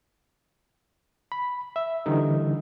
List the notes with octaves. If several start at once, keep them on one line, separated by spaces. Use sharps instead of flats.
B5
E5
D3 E3 G3 D#4